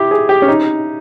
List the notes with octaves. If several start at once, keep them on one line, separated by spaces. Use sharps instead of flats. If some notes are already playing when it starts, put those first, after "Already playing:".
Already playing: E4 G4
G#4
G4
C#4
D#4